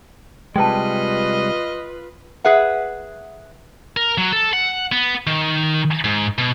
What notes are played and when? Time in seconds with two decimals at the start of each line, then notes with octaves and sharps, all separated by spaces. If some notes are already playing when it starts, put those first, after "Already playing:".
0.56 C3 G3 G#3 F4 B4 D#5 G5 A5
2.44 G#4 B4 E5 F#5
3.97 A#4
4.18 F#3
4.33 A4
4.53 F#5
4.92 B3
5.27 D#3
6.04 G#2
6.38 B2